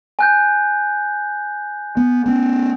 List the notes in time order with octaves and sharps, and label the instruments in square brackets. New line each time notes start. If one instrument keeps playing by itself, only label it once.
[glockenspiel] G#5 F#6 G6
[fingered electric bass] B3
B3 C#4